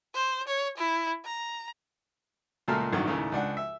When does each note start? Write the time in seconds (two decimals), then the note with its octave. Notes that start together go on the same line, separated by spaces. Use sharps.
0.15 C5
0.48 C#5
0.77 E4
1.25 A#5
2.68 C#2 A#2 A3 A#3 A5 F6
2.92 A1 G2 D#3 F#3
3.07 D#2 A2 C#3
3.32 C#2 D4 F#5
3.57 E5